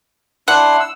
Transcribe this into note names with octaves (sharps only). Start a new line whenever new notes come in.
D4 E4 F#5 C6
E6